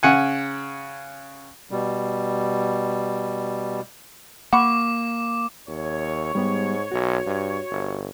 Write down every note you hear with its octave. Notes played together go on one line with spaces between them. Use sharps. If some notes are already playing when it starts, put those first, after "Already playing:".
C#3 F#5 G#5
B2 G3
A#3 F#5 B5 C#6 D6
D#2 C#5
G#2 G3 B3 G4
B1 F#4
G2
G1